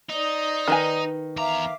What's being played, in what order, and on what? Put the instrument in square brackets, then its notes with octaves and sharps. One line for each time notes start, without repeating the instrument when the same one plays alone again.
[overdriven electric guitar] D#4 [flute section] C5 D5 D#6
[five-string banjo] D#3 B4 G#5
[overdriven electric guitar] E2 A#5 [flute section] E5 F5 D6